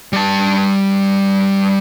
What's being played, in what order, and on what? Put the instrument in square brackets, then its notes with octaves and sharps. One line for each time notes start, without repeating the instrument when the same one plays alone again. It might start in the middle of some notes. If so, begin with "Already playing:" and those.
[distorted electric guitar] G3 A5